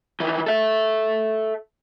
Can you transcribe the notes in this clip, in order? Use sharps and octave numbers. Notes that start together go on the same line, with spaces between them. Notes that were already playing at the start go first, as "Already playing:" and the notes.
D#3 E3
A4 E5